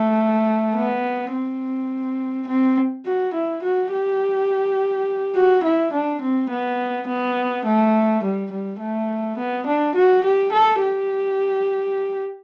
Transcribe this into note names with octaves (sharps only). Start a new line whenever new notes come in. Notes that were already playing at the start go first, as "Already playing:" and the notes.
Already playing: A3
B3
C4
C4
F#4
E4
F#4
G4
F#4
E4
D4
C4
B3
B3
A3
G3
G3
A3
B3
D4
F#4
G4
A4
G4